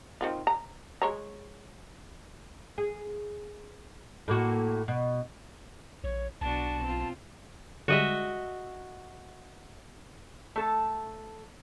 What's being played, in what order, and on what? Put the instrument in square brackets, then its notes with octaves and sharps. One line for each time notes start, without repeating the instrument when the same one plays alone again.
[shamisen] D#3 C4 F4
A#5
G#3 C#5 A#5
[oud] G#4
A2 A#3 F#4
B2
[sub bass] A#1 [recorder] C#5
[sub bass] B1 [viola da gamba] B2 D4 F#4 [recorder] A5
[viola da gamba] C4 F4
[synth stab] D3 G3 G#3 [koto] F#4 D#5 E5
[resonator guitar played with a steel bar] A3 A4 A5